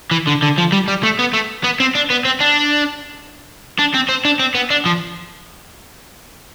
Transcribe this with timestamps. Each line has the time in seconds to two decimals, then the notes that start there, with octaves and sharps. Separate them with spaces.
0.11 E3
0.27 D3
0.42 D3
0.58 F3
0.72 G3
0.88 G3
1.03 A3
1.19 B3
1.34 A3
1.64 B3
1.80 C4
1.95 D4
2.10 B3
2.25 C4
2.40 D4
3.79 D4
3.94 C4
4.09 C4
4.25 D4
4.40 C4
4.55 B3
4.70 D4
4.86 F3